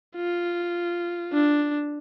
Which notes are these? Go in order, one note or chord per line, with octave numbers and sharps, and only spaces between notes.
F4
D4